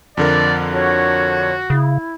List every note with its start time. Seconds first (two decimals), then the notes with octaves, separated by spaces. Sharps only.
0.17 F2 D3 A#4 D5
0.73 F#4 C#5
1.70 C#3 E4